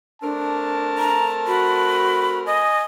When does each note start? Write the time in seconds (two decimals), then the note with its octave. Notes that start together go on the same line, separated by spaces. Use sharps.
0.22 A3 C4 D4 A#4 A5
0.98 A#5
1.47 F#4 B5
2.46 D#5 G#5